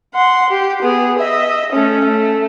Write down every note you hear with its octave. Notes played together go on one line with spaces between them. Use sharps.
F#5 C6
G4
B3 G#4
D#5 E5
A3 C#4
A3